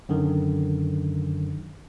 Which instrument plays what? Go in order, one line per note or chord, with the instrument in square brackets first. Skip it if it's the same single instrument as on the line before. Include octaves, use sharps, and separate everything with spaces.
[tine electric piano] F#2 D3 D#3